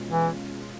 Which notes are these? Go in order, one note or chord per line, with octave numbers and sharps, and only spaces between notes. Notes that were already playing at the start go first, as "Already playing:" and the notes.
Already playing: B2 G#3 C#4 F4
E3